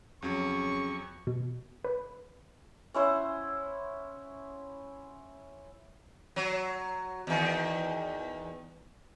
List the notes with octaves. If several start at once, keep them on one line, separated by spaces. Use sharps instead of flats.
F2 C#3 F#3 C#6
B2
B4
C#4 E4 C5 F#5
F#3
E2 D#3